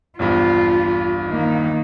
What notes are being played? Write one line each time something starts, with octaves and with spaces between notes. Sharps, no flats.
A#1 E2 G2 F4
D#3 A#3